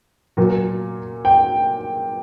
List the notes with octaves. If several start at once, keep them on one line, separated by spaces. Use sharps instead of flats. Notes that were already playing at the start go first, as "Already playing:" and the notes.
A#2 F#3
G5